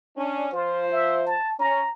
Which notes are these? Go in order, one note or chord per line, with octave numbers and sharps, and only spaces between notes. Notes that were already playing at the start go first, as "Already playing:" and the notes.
C#4 D4
F3 F4 C5
E5
A5
C#4 A#5